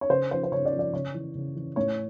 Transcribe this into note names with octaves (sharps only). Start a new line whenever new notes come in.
C#5
C#3 C5
F3 C5
C5
C#3 C#5
D5
F3
D5
C#3 C#5
E3
C#3
E3
A2 C#5